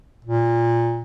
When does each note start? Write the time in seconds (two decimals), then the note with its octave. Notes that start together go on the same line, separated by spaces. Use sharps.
0.25 A#2